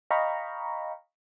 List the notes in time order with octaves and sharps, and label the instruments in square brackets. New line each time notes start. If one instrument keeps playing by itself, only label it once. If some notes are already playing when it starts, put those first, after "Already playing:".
[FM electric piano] D#5 F5 G5 A#5 B5 C#6